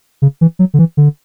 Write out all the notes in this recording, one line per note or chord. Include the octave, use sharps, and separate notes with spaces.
C#3
E3
F#3
D3
E3
D3